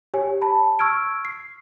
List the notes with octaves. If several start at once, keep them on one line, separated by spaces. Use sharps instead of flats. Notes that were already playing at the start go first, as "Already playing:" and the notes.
G4 C#5 G#5
A5 B5
C#6 E6 F6 G#6 D7
C7